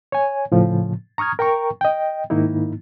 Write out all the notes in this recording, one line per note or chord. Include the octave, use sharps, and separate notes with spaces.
C#5 G#5
A2 C#3 F3
A#5 C#6 D#6 F6 G#6
A#4 G5 A#5 C#6
D#5 G5
G#2 D#3 A#3 D#4 E4